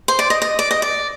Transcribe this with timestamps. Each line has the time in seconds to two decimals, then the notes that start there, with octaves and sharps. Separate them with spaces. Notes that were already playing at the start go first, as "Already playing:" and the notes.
0.08 C5
0.19 D5
0.30 D#5
0.42 D#5
0.59 D5
0.71 D#5
0.82 D5